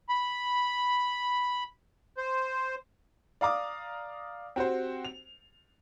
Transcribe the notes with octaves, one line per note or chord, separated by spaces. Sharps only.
B5
C5
D5 F5 A#5 D6 D#6
C4 F#4 G4 C5
F7